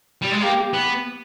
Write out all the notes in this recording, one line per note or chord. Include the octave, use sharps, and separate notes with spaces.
G3
G#3
A#3 G4
B3